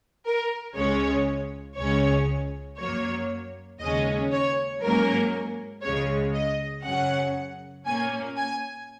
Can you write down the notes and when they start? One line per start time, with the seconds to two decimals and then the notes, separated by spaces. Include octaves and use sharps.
0.25 A#4
0.76 C#2 C#3 G#3 C#4 C#5
1.77 C#2 C#3 G#3 C#4 C#5
2.79 F#2 F#3 A#3 C#5
3.80 D#2 C#3 G#3 C#4 D#5
4.31 C#5
4.81 G#2 F#3 A#3 C#4 A#4
5.82 C#2 C#3 G#3 C#5
6.34 D#5
6.84 F#2 C#3 F#3 C#4 F#5
7.86 A#2 A#3 C#4 G#5
8.37 G#5